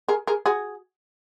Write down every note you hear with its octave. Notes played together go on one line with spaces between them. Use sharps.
G#4 A#4
G#4 A#4
F#4 G#4